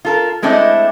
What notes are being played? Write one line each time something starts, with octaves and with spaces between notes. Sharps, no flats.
F4 A4 A#4
G#3 A3 C4 D4 E4 D#5